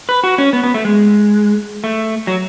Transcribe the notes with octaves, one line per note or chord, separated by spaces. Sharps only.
B4
F#4
C#4
B3
B3
A3
G#3
A3
F#3